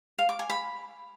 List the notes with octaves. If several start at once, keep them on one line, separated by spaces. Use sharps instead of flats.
F5
D6
G#5
B5